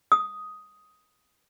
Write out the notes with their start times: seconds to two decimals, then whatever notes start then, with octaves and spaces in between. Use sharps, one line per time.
0.12 D#6